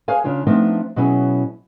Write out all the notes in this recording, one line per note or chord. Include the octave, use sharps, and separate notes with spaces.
G#4 B4 C#5 F5 G#5
C#3 D4 F4 C#5
F3 A3 B3 C4 D4 D#4
B2 F#3 C#4 E4 G#4